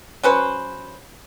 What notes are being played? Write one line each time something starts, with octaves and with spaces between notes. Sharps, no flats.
F#3 C#4 B4 C5